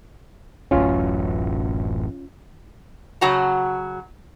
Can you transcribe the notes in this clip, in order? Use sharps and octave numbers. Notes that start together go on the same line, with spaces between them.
D1 A1 F#2 C#4 F4
C#3 F#3 F#4 F#5 A5 A#5